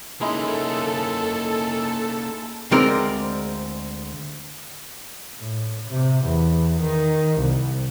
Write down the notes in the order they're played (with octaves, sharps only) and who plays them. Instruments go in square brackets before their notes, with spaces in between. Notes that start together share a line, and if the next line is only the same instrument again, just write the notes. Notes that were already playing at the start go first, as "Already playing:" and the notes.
[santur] G#3 D#4 E4 [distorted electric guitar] A#3 C#4 [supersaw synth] A4
[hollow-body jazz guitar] D2 G#3 C4 A#4 D5
[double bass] A2
C3
E2
D#3
C2